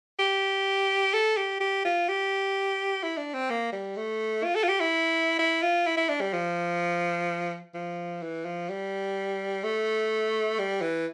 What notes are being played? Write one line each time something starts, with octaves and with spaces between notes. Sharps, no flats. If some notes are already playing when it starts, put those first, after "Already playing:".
G4
A4
G4
G4
F4
G4
E4
D4
C4
A#3
G3
A3
F4
A4
F4
G4
E4
E4
F4
E4
E4
D4
G3
F3
F3
E3
F3
G3
A3
G3
E3